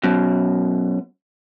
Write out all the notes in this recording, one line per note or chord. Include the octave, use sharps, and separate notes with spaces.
F#2 B2